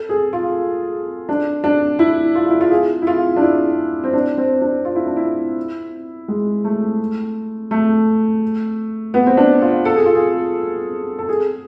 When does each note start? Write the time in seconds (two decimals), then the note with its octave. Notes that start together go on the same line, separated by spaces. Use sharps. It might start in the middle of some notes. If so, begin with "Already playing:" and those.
Already playing: A4
0.09 G#4
0.33 F4
1.29 D4
1.64 D4
1.99 E4
2.35 F4
2.50 E4
2.61 F4
2.71 G#4
3.02 E4
3.07 F4
3.36 D4
3.42 E4
4.04 C4
4.13 D4
4.37 C4
4.62 D4
4.85 F4
4.95 E4
5.06 D4
5.16 E4
6.28 G#3
6.64 A3
7.71 A3
9.14 B3
9.26 C4
9.37 D4
9.62 F4
9.85 A4
9.96 G#4
10.06 F4
10.15 G#4
11.18 A4
11.29 G#4